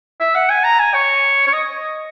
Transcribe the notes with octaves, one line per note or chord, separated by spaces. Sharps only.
E5
F#5
G#5
A#5
G#5
C#5
C#5
D#5